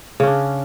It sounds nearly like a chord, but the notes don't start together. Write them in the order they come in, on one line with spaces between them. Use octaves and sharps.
C#3 C#4 D4